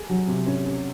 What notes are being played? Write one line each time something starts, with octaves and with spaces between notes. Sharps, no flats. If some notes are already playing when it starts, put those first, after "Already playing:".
Already playing: G#4
F#3
C3
C#4
C#4